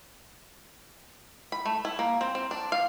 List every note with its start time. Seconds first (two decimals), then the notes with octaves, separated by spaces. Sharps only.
1.52 B5
1.66 A3
1.85 E4
1.99 A#3
2.21 C4
2.35 C4
2.51 D4
2.72 F5